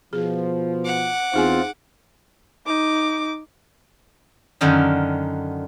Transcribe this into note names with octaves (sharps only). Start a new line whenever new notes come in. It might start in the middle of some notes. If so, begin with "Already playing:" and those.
B2 F3 G#4
F#5 D6
E2 C4 D#4 F4 G#4 G#5
D#4 D6
F#2 D3 D#3 D#4